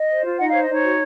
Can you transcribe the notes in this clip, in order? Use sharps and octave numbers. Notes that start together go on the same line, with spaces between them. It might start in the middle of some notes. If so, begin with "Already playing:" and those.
Already playing: D#5
C5
F4
D#4 D#5 F#5
C#5 F5
C5
D#5
D#4 C#5
F#4